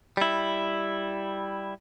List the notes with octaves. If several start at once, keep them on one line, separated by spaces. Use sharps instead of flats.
G3 E4